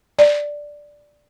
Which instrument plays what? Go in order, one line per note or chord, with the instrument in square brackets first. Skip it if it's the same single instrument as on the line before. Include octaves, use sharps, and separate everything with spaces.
[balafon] D5